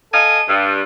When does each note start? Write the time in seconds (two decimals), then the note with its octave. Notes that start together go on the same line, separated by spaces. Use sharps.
0.12 A4 D#5 F5 G#5
0.46 G2